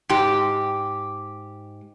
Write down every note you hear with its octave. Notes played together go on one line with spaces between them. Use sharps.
G#2 G4